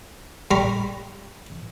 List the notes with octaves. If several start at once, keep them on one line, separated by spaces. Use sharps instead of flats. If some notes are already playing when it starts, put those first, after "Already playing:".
G3 A#5 B5 C#6